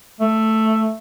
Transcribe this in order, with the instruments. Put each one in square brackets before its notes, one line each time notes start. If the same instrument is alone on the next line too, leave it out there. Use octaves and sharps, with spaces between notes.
[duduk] A3